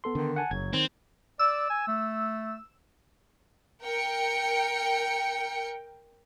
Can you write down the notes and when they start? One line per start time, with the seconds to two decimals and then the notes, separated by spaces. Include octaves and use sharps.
0.04 B3 A4 C6
0.15 D3 D#3
0.36 F#5 G#5 A5
0.51 F#1 F#3 G#6
0.73 D#3 C4
1.39 D5 E6
1.70 G#5
1.88 A3
3.83 A#4 G5 C#7